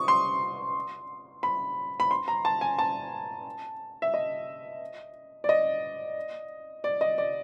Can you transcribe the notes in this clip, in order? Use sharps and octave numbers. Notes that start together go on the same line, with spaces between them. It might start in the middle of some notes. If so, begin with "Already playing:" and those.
Already playing: C#6 D#6
C6
B5
B5
C6
A#5
A5
G#5
A5
E5
D#5
D5
D#5
D5
D#5
D5